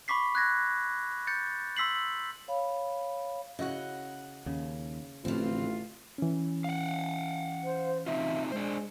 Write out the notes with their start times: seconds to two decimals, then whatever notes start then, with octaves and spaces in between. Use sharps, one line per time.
0.08 B5 C#6 D6 B6 C7
0.35 F#6 G#6 A#6
1.27 G6 A6 C#7
1.76 C6 E6 B6 C7 F#7
2.48 C#5 F5 B5
3.59 C#3 E4 F#4 D#5 F#5
4.46 D#2 C#3
5.25 A1 A2 D3 E3 F3 A3 C4 F4
6.18 E3 C#4
6.64 F5 F#5
7.64 C5
8.07 C4 D#4 F4 E5
8.52 G#3 D4 C5